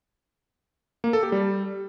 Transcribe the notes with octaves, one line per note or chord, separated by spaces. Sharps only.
A#3
A4
G4
G3